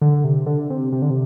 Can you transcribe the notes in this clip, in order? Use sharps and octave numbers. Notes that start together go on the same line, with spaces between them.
D3
C3
D3
C3
C3
D3
C3